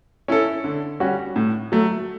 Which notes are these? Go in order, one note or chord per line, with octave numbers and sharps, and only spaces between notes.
C#4 E4 A4
D3
G3 C#4 F#4
A2
F#3 A3